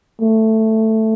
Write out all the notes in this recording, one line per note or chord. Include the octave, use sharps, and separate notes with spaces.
A3